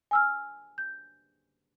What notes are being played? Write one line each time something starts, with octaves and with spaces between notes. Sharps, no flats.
G#5 E6 F6
G6